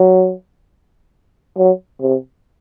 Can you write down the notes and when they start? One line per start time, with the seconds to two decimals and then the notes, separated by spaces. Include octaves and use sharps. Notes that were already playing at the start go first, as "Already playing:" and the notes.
Already playing: F#3
1.58 F#3
2.02 C3